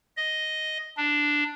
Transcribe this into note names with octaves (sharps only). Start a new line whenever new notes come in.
D#5
D4